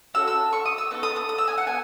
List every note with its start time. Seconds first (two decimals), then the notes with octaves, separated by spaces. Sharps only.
0.14 C#4 F#4 A4 E6
0.28 E6
0.53 C#6
0.66 D#6
0.78 E6
0.91 B3 D#4 A4 C#6
1.03 D#6
1.16 D#6
1.29 D#6
1.38 E6
1.48 G#5
1.58 F#5
1.67 B3 G#5